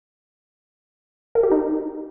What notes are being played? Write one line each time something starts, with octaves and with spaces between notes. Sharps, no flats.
A#4
G4
D#4